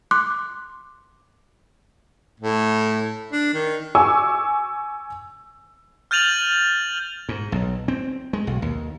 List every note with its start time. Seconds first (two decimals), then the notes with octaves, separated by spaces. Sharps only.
0.11 C6 D6 F#6
2.40 A2
3.32 D4
3.54 D#3
3.95 G#5 C#6 D6 E6
6.11 F6 G6 A6 D#7 F7 F#7
7.29 G#2
7.52 B1
7.88 C4
8.33 G#3
8.47 B1
8.62 D#2